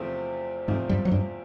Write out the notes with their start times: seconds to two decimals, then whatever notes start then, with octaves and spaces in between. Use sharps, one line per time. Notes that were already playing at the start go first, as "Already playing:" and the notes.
Already playing: E2 C3 F3 A3 C4
0.68 E2 G#2 C3 F3 G#3 A3 C4
0.89 G2 G3
1.05 F#3
1.11 G2 G3